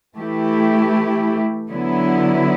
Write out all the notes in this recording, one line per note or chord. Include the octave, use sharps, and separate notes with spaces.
E3 A3 E4 G4
D3 F#3 B3 E4